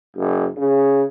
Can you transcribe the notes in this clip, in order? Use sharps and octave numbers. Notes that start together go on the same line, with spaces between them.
F#1
C#3